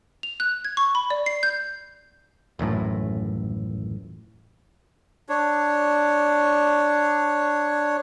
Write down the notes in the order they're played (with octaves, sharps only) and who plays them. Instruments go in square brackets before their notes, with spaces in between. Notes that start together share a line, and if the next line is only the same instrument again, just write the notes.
[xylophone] F7
F#6
G#6
C#6
B5
D5
C7
G6
[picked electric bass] D#1 A1 F#2 A2
[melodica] D4 C#5